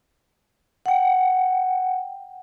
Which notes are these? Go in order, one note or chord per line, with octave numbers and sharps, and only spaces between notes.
F#5 G5